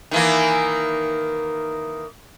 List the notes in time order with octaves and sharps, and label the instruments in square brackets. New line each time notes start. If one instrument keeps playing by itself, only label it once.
[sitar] D#3 E3 A#3